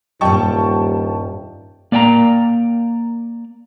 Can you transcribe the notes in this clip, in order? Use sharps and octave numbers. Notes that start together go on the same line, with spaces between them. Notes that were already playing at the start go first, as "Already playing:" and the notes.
D#1 G2 A#2 G3 G5 A5 C#6
A#3 D5 G5 G#5 A#5